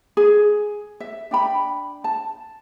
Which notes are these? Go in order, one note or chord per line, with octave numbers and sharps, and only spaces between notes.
G#4
E5
D4 G5 B5
A5